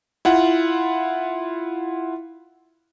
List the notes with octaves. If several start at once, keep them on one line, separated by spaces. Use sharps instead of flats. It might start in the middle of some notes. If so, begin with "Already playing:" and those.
E4 F4 F#5